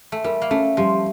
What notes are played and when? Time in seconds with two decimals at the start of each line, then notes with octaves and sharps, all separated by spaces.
0.12 A3
0.24 G3 A#4
0.42 A#3
0.51 A3 C#4
0.77 F3 G3